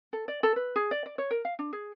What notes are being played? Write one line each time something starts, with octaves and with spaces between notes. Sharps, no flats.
A4
D5
A4
B4
G#4
D5
D5
C#5
A#4
F5
D4
G#4